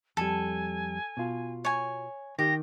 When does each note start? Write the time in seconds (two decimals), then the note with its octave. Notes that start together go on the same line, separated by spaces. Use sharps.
0.17 F2 G3 A4 G#5
1.17 B2 F4
1.65 C#5 G#5
2.39 D#3 G4 A#6